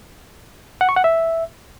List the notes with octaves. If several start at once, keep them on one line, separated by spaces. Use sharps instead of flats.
F#5
C#6
F#5
E5